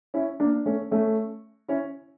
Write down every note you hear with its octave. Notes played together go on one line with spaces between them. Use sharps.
C#4 E4
A#3 D4
A3 C#4
A3 C#4
C#4 E4